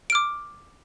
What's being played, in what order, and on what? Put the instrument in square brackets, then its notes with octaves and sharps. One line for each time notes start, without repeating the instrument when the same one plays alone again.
[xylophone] D7
F6
D6